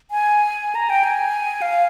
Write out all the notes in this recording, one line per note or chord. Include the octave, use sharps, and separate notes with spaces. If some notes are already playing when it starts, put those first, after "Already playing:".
G#5
A#5
G5
G#5
F5